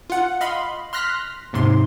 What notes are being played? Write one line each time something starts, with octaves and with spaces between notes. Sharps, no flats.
F4 F#5
D#5 F5 B5 C6
C6 F6 F#6 A#6 B6
D#2 G#2 C3 C6